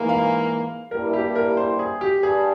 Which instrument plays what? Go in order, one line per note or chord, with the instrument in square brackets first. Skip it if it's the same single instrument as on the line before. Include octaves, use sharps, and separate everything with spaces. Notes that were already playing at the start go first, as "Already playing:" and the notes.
Already playing: [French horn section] G#2 E3 A#3
[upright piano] F5
[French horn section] G2 G3 A#3 E4 [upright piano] A#4
[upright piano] G4
A#4
C5
G#4
G4
[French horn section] G2 G3 [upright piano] G#4